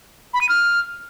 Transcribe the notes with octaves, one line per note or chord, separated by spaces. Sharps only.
B5
D#7
F6